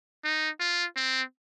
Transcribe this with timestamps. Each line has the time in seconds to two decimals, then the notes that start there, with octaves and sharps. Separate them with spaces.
0.24 D#4
0.60 F4
0.96 C4